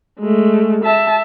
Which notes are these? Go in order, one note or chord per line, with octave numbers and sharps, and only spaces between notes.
G#3 A3
E5 A5